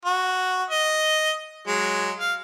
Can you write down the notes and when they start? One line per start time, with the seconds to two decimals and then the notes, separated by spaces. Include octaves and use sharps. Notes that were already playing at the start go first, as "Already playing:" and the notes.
0.05 F#4
0.70 D#5
1.67 F#3 G#3
2.20 F5